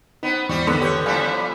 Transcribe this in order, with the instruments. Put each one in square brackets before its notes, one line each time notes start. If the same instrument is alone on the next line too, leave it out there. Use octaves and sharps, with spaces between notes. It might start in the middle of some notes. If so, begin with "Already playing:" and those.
[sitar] B3 C4 [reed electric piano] D#4
[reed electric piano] E2 G#2 C#6 [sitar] G3 C4 E4
[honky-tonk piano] D3 B3 [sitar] D#3
[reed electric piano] G4 B4 G6 [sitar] C#5
[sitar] F3 G3 E4 [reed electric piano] F5 G#5 B5